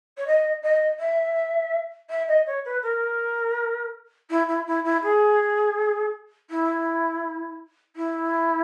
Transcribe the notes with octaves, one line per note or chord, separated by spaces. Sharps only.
C#5
D#5
D#5
E5
E5
D#5
C#5
B4
A#4
E4
E4
E4
E4
G#4
E4
E4